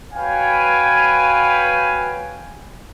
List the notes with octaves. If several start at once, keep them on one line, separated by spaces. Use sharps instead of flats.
F#4 B4 C#5 F5 G5 G#5